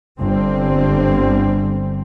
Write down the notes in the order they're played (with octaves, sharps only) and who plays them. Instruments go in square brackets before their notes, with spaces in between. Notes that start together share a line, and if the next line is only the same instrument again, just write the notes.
[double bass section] G1 D3 G3 C4